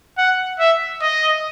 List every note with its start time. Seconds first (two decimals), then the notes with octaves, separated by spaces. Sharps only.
0.18 F#5
0.59 E5
1.01 D#5